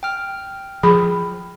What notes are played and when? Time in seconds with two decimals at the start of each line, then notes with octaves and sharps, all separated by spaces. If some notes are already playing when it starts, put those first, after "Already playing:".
0.03 G5 F6
0.83 F3 G#4 B5